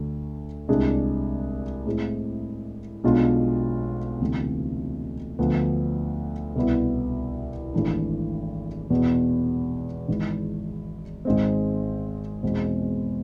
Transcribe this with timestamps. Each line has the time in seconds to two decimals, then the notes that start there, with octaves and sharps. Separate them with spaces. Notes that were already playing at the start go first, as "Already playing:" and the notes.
Already playing: D2 D3 A3
0.68 C2 C3 G#3 D4 G#4
1.86 A2 G#3 C4 E4 G#4
3.04 B1 B2 G#3 D4 F4
4.20 D2 C3 E3 B3
5.39 D2 D3 F3 B3 D4
6.56 C2 B2 B3 E4
7.74 G#1 G#2 E3 A3 D4
8.90 E2 B2 B3
10.08 G#1 G#2 E3 G#3
11.25 G#1 G#2 G#3 C4
12.43 E2 B2 G#3 C4